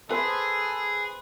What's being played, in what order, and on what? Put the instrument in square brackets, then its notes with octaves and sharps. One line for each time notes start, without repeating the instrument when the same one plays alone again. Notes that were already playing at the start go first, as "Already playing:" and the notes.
[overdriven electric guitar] G#4 [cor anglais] A4 [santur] B4 C5 C6